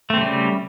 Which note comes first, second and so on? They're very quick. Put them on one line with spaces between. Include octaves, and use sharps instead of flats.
A3 C4 C#3 G3